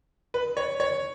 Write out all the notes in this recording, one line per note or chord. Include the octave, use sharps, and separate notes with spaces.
B4
C#5
C#5